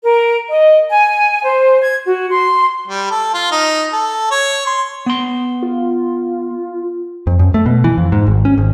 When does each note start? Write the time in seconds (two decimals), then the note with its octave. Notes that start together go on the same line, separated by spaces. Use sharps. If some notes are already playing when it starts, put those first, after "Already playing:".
0.04 A#4
0.49 D#5
0.91 G#5
1.44 C5
1.82 G#6
2.06 F#4
2.30 C6
2.88 G3
3.11 A4
3.34 F4
3.51 D#4
3.93 A4
4.31 C#5
4.67 C6
5.06 B3 C6
5.63 F4
7.27 F2
7.39 F#2
7.54 A3
7.66 B2
7.84 E3
7.98 F2
8.12 G#2
8.27 G#1
8.45 C#4
8.58 G#1